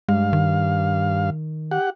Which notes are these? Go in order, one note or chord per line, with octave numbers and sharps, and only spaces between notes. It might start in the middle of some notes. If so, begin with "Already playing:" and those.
G2 G#3 F5
D#3
G4 F#5